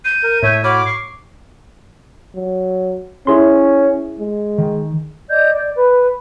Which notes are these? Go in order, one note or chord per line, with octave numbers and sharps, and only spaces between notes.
G6 D#7
A#4
A2 C#5 E5
F#4 C#5 B5 D6 F6
C#6 C7
F#3
C#4 E4 G#4 C6
G#3
D#3
D5 D#5 G6
D5
B4